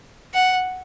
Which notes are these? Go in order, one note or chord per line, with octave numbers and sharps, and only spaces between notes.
F#5